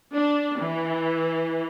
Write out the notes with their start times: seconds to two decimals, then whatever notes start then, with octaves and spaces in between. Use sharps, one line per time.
0.14 D4
0.60 E3